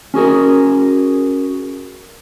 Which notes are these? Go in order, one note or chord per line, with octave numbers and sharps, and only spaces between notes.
C#4 F#4 G#4 A#4